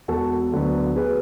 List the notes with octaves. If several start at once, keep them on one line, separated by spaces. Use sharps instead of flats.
E1 F#4 A4
D2 D3 F#3 B3
G#4 B4